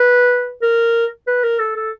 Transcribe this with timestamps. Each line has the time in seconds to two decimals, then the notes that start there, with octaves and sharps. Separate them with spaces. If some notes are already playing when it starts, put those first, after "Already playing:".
Already playing: B4
0.62 A#4
1.27 B4
1.44 A#4
1.59 A4
1.76 A4